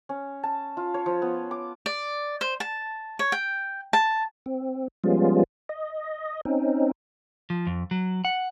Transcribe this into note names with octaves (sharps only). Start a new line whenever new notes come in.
C#4
A5
F4
C#5
F3
B3
D6
D5
C5
A5
C#5
G5
A5
C4
F3 G3 G#3 B3 C#4 F4
D#5
C4 C#4 D#4
F3
F2
F#3
F#5